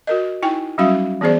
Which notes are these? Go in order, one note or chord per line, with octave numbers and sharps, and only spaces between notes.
F#4 A#4 D#5
D#4 E4 G5 G#5
F#3 G3 C#4 F#4 E5 F5
E3 B3 G#4 C5 D5